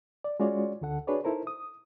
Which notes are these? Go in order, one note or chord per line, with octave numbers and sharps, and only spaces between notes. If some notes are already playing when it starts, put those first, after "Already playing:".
D5
G#3 C#4 F4 F#4 C#5 D5
D2 D3 A4 F#5
D4 F#4 G#4 B4 C#5 D5
D#4 E4 A4 A#4 C5
D#6